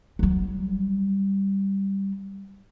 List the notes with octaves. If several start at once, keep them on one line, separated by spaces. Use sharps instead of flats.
F#3 G3